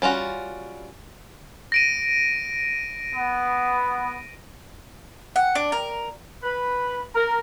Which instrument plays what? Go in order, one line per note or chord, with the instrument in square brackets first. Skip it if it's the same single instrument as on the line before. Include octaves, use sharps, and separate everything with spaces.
[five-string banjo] G3 C#4 F4 F#4
[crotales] A#6 D7 D#7
[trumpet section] B3
[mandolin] F#5
D4
A#4
[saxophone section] B4
A#4